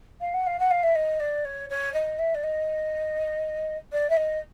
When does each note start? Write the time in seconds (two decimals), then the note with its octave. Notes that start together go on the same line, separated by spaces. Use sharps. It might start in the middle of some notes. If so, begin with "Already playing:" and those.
0.20 F5
0.34 F#5
0.46 F5
0.59 F#5
0.70 F5
0.83 E5
0.95 D#5
1.20 D5
1.45 C#5
1.69 C#5
1.93 D#5
2.18 E5
2.34 D5
2.43 D#5
3.92 D5
4.09 E5
4.16 D#5